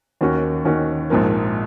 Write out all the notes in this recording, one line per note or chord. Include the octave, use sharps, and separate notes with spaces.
D#2 D#3 A#3 C#4 F#4
D#2 D#3 A#3 C#4 F#4
A#1 G#2 F3 A#3